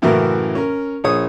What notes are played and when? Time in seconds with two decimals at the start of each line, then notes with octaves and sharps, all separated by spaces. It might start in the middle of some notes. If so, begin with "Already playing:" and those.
0.02 F#2 A2 C#3 E3 F#4 A#4
0.55 C#4 A#4
1.04 A#1 G#4 C#5 D#6